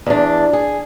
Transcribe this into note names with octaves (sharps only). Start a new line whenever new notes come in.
E2 D4
G#4